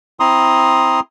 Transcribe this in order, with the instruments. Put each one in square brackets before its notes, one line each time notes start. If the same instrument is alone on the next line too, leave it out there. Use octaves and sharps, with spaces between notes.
[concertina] C4 E4 A#5 C6 D#6